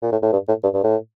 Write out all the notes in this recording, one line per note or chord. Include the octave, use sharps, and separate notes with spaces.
A#2
A2
A2
G2
A2
G2
G2
A2